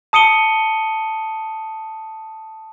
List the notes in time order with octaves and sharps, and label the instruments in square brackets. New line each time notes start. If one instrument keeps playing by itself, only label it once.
[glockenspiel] A5 D#6 C#7 D#7 G7